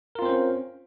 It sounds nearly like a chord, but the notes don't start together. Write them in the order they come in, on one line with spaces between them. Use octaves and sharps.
A#4 F4 C4 C5 C#4